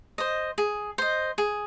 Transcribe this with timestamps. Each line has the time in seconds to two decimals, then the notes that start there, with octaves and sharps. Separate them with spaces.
0.18 C5 D#5
0.58 G#4
0.98 C5 D#5
1.38 G#4